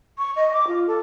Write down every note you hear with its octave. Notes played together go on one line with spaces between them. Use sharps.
C#6
D#5
D6
F4
A4